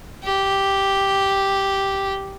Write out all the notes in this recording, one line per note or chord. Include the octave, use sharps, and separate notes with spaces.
G4